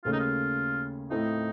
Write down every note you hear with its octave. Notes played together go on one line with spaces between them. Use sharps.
D#2 C#3 A3 C#4 F4
D#4
F4
A2 A3 C4 D#4 F4 A4